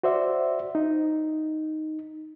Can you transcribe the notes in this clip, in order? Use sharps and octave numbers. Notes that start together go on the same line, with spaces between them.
F#4 C5 D5 E5
D#4